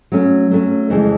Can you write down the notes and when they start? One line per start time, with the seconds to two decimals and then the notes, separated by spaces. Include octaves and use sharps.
0.12 F#3 A3 C#4
0.51 F#3 A3 C#4
0.90 F2 C#3 E3 G#3